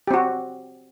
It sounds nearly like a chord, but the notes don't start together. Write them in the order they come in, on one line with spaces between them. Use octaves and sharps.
G4 C4 F#4